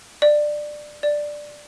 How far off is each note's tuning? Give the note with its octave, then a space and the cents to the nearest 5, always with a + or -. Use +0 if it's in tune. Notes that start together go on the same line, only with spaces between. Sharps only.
D5 +15
D5 +5